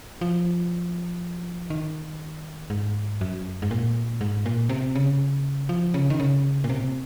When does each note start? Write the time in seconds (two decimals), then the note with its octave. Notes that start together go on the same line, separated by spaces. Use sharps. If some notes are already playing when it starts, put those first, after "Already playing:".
0.21 F3
1.70 D#3
2.70 G#2
3.21 F#2
3.62 G#2
3.71 A#2
4.21 G#2
4.46 A#2
4.69 C3
4.95 C#3
5.69 F3
5.94 C#3
6.10 D#3
6.20 C#3
6.64 A#2
6.70 C3